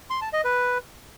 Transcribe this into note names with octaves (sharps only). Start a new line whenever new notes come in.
C6
A5
D#5
B4